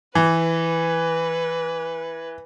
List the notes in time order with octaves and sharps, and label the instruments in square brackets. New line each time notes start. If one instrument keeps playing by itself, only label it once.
[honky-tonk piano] E3 [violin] B4